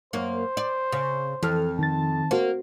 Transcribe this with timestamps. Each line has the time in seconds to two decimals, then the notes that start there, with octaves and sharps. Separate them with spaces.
0.13 F#2 A#3 C5
0.57 D5
0.92 C#3
1.43 F2 E3 A4 F6
1.79 D#3 A5 A6
2.31 A#3 F#4 C5